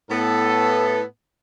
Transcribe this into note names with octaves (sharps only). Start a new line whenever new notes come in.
A2 B3 A4